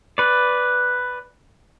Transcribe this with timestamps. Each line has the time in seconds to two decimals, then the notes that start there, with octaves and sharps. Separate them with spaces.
0.18 B4 D5